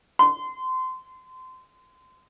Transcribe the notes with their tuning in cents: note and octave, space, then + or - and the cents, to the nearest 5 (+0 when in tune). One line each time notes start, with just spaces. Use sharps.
C6 -25